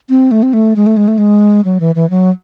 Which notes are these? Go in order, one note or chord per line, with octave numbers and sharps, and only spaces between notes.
C4
A3
C4
A3
G#3
A3
G#3
A3
G#3
F#3
E3
E3
F#3